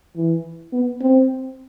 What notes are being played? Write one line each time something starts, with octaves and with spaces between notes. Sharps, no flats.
E3
B3
C4